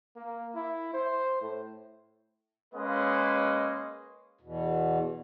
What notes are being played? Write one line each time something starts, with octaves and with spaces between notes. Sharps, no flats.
A#3
E4
C5
A2
G#3 A#3 C#4 B4 D#5 C6
E2 B2